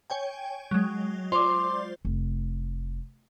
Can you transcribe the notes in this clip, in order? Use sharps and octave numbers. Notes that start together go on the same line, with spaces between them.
C#5 G5 G#5
F#3 G#3
F4 C5 D5 C6 D6
F1